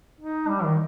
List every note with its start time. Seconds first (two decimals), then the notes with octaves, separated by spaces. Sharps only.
0.21 D#4
0.48 G3
0.63 D#3